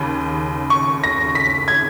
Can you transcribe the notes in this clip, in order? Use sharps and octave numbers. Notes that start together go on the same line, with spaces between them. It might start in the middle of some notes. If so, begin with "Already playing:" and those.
Already playing: D#2 C#3 B5
C#6
A#6
B6
G#6